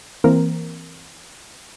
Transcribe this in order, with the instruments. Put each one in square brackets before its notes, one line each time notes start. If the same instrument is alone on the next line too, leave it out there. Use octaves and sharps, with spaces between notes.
[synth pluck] E3 A#3 C4 A#4